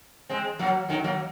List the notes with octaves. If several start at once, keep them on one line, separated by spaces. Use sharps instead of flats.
G#3 C4
F#3 A#3
D#3 F#3
F#3 A#3